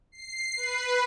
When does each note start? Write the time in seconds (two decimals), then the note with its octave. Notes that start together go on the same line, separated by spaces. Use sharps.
0.12 C7
0.57 B4